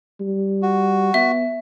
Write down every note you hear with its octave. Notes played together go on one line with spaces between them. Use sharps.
G3
F#4
B3 E5